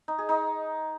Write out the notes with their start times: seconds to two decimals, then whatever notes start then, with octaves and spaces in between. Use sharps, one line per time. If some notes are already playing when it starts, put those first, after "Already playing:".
0.08 D#4
0.18 G#4
0.29 D#4